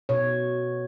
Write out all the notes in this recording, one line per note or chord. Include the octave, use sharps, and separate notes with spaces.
B2 C#5